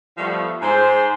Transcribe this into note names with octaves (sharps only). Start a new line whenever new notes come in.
F3 G3 A3 B3
G#2 G#4 C5